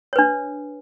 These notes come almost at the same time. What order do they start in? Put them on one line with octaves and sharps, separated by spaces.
C#5 B4 D4